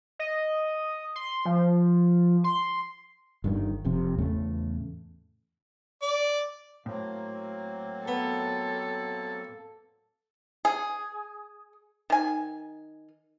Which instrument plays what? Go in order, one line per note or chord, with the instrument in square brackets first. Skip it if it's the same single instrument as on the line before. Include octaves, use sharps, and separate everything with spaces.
[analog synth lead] D#5
C6
F3
C6
[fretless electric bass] G1 G2 D3 D#3
F1 F2 C3
E2 A2 C#3 A3
[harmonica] D5
[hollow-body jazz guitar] A2 [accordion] F#3 A#3 C4
[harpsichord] B3 [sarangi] A4
[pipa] G#4
D#3 G#5